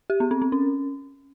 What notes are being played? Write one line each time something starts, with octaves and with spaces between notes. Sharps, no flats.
G4
B3
C4
C4
C#4